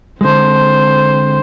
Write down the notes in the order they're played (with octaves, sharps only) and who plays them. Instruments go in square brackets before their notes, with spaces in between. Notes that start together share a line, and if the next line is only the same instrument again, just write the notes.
[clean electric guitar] D3 G#3 [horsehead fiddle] C4 C5